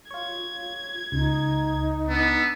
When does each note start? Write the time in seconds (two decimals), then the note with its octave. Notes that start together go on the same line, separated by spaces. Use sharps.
0.11 F4 C#5 G#6
1.12 C#2 D#4
2.08 B3 D4 E6